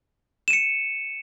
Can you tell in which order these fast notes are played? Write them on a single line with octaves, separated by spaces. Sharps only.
E7 D#7 C#7